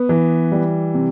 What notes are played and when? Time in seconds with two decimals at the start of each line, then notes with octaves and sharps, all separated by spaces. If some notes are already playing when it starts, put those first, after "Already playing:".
Already playing: B3
0.09 E3
0.52 G3
0.94 C3